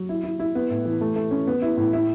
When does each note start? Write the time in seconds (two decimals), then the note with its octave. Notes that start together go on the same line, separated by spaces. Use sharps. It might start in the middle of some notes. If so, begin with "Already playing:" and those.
Already playing: F#3
0.09 E4
0.24 E4
0.39 E4
0.55 B3
0.70 A2
0.85 E3
1.01 A3
1.16 A3
1.31 C#4
1.47 B3
1.62 E4
1.77 A2
1.93 E4